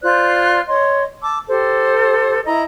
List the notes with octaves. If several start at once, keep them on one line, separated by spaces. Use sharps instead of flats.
F4 C5 D5 F#6
C#5 D#5 C6
A5 D6 E6
G4 A4 C5
E4 D#5 A#5